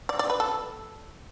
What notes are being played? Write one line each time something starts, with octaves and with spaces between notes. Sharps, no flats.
D5
D5
B4
A4